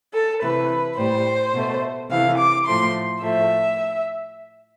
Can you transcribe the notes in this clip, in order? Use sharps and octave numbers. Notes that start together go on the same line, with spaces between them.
A4
C3 E3 A3 B4
A2 G3 C5
B2 A3
C3 E3 A3 F5
D6
A2 F3 A3 C6
A2 F3 A3 E5